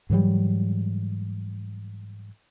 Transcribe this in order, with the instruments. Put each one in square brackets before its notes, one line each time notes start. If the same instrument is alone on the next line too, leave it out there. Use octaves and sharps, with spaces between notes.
[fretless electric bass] G#2 E3 F#3 G3